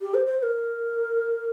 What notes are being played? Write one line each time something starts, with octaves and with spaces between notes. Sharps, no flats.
G4
C5
C5
C5
A#4